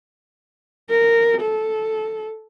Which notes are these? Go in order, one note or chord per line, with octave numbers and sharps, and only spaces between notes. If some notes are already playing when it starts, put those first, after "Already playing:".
A#4
A4